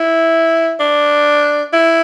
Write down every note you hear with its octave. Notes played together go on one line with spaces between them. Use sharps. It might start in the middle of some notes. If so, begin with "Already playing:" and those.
Already playing: E4
D4
E4